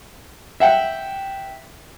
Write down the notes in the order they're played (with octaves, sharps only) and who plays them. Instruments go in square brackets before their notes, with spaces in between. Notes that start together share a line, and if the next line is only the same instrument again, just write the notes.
[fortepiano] E5 F#5 G5